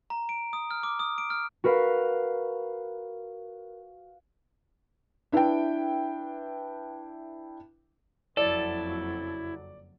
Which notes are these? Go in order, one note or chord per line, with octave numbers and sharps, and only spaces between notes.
A#5
D7
D#6
F6
D6
D#6
D7
F6
F#4 A#4 B4 F5
D4 E4 B4 E5 G5
F#1 F2 F#3 E4 A4 D5